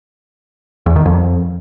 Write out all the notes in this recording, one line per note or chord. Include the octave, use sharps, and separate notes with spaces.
E2
D#3
F2